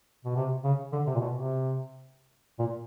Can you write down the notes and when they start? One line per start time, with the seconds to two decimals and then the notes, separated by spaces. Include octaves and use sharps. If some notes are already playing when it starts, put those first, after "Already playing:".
0.25 B2
0.36 C3
0.64 C#3
0.92 D3
1.07 C3
1.15 A#2
1.21 B2
1.34 C3
2.59 A#2